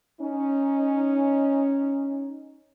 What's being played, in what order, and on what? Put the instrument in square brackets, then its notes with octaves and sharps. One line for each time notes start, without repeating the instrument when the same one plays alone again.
[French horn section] C#4 D#4